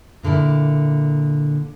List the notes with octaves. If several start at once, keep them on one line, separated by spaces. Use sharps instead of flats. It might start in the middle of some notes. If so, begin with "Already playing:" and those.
A#2 D3 A#3 E4